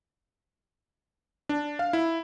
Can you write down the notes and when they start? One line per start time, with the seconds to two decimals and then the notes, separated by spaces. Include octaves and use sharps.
1.49 D4
1.79 F5
1.93 E4